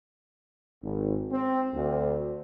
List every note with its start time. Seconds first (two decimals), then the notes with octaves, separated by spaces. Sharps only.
0.82 G#1
1.31 C4
1.74 D2